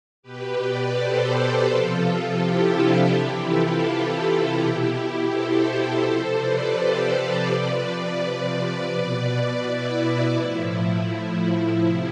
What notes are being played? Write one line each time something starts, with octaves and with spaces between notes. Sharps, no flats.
B2 G4 B4
B4 D5
A4 C5
C3 F3 F4 A4
E4 G4
D4 F4
C3 E3 E4 G4
F4 A4
E4 G4
B2
A4 C5
A4 C5
C3 F3 A4 C5
B4 D5
G4 B4
G4 B4
C3 F3 B4 D5
B2
E4
A2 F3
C3 F3